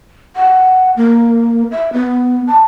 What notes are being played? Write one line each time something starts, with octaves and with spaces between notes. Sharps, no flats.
F#5
A#3
E5
B3
A5